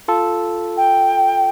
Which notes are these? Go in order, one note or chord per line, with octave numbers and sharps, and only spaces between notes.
F4 A4
G5